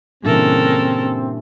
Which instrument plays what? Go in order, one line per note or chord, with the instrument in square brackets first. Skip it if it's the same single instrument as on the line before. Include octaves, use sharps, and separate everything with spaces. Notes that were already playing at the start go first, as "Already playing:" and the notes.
[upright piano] G2 A#2 E3 [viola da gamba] C#3 A4 A#4 [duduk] C4